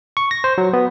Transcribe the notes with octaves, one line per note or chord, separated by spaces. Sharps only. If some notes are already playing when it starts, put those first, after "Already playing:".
C#6
A#6
C5
F#3
B3